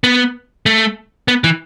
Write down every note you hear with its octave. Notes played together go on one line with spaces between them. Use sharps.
B3
A3
B3
E3